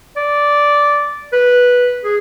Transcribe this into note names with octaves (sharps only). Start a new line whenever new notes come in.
D5
B4
G#4